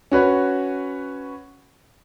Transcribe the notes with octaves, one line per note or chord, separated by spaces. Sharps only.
C#4 F#4 B4 C#5